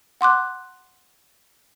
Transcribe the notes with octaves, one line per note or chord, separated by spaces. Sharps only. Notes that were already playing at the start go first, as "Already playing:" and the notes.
F#5 C6 D6 F#6